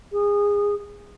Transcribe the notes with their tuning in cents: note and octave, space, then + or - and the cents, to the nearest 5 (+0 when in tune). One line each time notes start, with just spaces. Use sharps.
G#4 -25